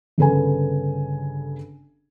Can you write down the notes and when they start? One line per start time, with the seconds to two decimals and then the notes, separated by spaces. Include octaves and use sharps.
0.18 G1 C#3 A4 B4 G#5